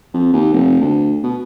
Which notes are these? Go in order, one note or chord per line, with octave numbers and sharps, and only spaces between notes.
F2
D#2
F1
D2
B2